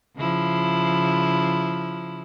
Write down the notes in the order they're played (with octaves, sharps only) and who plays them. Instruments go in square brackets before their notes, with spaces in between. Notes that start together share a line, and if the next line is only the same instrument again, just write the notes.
[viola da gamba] C#3 F3 E4